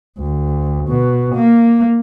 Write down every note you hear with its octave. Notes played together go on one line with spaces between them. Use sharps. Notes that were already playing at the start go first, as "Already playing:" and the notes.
D2
B2
A#3